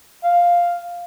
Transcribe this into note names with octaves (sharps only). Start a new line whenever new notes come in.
F5